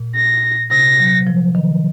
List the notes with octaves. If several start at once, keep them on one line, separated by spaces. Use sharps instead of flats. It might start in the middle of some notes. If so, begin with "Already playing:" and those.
Already playing: A#2
A#6
C3 A#6
F#3
F3
D#3